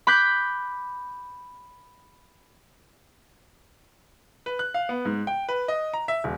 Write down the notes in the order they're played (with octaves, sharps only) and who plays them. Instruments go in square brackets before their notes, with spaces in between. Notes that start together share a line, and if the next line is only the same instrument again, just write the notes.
[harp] B5 D6 F#6 G6 B6
[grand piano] B4
F#6
F5
B3
G#2
G5
B4
D#5
A#5
E5
D#1